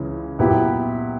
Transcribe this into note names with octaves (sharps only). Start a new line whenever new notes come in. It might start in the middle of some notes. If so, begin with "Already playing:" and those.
Already playing: C#2 C#3 E3 G#3 C#4
A#2 F#3 B3 E4 G4